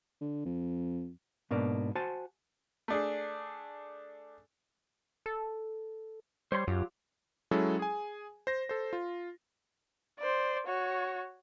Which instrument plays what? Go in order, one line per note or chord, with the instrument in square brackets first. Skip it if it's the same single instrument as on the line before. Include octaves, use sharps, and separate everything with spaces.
[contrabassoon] D3
F2
[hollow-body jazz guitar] G#2 B2 A#3 D4
F#4 C5 G#5 A5
[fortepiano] A3 D4 G#4
[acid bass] A4
[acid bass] G3 [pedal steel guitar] C5 C#5 C6
[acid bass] F#2 [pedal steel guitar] F#3 F4 G4
[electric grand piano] F#3 G#3 C#4 E4 G#4 A4
G#4 G#5
C5 A#6
A4 C5
F4
[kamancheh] C5 D5
F#4 C#5